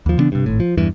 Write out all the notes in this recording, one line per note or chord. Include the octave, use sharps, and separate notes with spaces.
D#2 F3
C#3 E3 B3 D4
G2 C3
G#1 A2
F3
E2 G2 E3